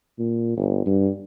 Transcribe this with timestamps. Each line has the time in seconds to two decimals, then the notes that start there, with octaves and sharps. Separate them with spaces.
0.19 A#2
0.57 G1
0.86 G2